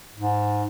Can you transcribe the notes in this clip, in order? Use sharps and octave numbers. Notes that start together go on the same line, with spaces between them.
G#2